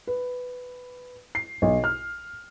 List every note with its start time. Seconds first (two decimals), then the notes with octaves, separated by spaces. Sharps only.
0.07 B4
1.35 C7
1.62 B1
1.84 F6